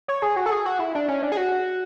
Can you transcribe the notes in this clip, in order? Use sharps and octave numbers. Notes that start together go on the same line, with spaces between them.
C#5
G#4
F#4
A4
G#4
F#4
E4
D4
C#4
D4
G#4
F#4